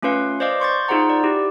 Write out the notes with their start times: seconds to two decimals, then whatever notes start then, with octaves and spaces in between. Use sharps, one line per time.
0.02 A3 C#4 F4 B4 F5
0.40 C5 D5 D#5 F5 D6
0.60 C6 C#6 G6 A6
0.88 D#4 F4 G#4 C5 F#5 A#5
1.10 D5
1.24 E4 G4